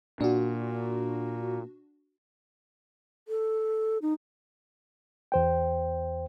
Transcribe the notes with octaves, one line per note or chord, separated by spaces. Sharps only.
A#2 D4 F#4
A4
D#4
E2 C5 G5